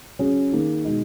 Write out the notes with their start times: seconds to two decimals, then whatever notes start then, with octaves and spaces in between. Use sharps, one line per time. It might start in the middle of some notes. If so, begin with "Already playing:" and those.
0.19 C#3 F#3 C#4 G#4
0.52 D#3 A#3 D#4 G#4
0.85 B2 G#3 D#4